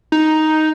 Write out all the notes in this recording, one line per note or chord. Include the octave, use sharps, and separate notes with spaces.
D#4